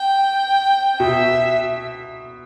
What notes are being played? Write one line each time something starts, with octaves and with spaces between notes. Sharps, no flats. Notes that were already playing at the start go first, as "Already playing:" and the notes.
Already playing: G5
B2 E5